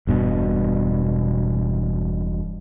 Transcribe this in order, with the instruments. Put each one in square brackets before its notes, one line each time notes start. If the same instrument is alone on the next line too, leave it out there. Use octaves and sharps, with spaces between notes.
[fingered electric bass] E1 G2 B2